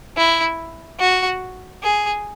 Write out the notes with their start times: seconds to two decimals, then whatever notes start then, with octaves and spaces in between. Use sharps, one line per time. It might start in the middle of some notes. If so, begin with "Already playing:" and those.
0.17 E4
1.00 F#4
1.83 G#4